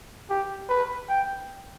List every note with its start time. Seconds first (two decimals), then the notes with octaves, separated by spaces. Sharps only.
0.30 G4
0.69 B4
1.09 G5